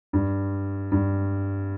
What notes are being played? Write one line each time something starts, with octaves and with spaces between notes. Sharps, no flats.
G2
G2